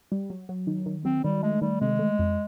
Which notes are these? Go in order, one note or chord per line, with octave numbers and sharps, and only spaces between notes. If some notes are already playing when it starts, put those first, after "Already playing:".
G3
F#3
F#3
D#3
D#3
F#3 C4
D#3 G3
G#3 A3
D#3 G3
C3 G#3
A3
F2